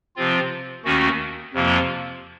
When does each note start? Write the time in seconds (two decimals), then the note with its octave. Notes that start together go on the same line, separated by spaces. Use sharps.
0.16 C3 F3 C4 F4
0.84 D#2 D#3 A3 C#4 F#4
1.54 F2 C3 F3 A#3 F4